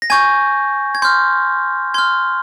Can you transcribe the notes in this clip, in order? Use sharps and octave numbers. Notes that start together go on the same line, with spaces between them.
A#6
G#5 C#6 G6 G#6
G#6
C6 F6 G6
C6 F6 G#6